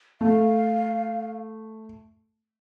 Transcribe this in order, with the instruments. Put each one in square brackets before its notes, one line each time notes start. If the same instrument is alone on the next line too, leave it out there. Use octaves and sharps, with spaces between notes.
[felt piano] A3 [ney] F5